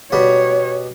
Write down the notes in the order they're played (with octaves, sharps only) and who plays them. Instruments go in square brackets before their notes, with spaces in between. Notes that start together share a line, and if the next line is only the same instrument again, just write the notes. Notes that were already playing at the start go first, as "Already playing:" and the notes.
[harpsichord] B2 G3 [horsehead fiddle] C#5